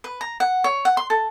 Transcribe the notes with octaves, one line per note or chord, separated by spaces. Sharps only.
B4
A#5
F#5
C#5
F#5
C6
A4